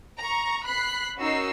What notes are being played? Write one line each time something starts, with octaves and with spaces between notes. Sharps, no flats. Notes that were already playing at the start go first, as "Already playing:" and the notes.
A#5 C#6
B5 F#6 B6 C7
C#4 D#4 F#4 A#4 E6 C7